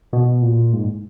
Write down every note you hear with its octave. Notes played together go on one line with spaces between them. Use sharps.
B2
A#2
G#2